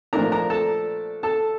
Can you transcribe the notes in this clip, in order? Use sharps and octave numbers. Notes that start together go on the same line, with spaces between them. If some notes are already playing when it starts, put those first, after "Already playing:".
A#2 F3 A3 D4 A#4 A#5
A#4 A#5
A4 A5
A4 A5